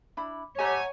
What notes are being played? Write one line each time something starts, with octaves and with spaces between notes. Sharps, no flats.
D4 E4 B5
A3 G4 C#5 D#5 F#5 G#5 A#5